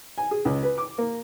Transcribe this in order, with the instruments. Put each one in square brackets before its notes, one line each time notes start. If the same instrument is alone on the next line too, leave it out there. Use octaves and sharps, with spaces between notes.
[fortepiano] G#5
G#4
C#2
B4
D6
A#3